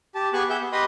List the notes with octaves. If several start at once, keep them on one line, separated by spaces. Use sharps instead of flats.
G4 A5
B3 G4 G#4 G#5 C#6 F#6
G4 G#4 E5 F#5 G6
B3
G4 B4 D#5 B5 C6 D#6